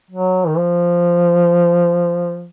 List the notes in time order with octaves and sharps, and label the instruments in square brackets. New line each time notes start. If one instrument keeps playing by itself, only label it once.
[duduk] F#3
D#3
F3